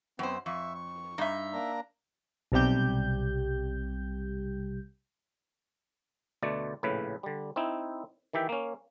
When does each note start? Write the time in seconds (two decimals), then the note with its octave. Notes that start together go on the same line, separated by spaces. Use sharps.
0.19 F#2 B3 C4 C5
0.46 F2 E5 C#6
0.75 C#6
1.18 G2 D#4 E5
1.53 A#3 D4 A#5
2.52 B1 C3 G3 G4 G6
6.42 D2 B2 A3 D5
6.83 A#1 A2 C#3 B4
7.23 D3 G3
7.56 C4 D#4 E4
8.33 D#3 E3 G4 E5 G5
8.49 A#3 C#4